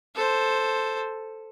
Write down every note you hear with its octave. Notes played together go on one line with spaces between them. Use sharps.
A4 C5